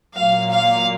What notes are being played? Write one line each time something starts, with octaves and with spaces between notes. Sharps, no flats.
A#2 F#3 A#3 F5
F5